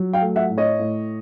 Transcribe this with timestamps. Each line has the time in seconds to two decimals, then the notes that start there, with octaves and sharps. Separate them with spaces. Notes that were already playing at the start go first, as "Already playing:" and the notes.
Already playing: F#3
0.13 F5 G5
0.21 A3
0.36 E5 F#5
0.50 A2
0.58 C#5 D#5
0.79 A2